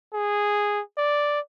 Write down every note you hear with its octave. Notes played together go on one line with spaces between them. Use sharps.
G#4
D5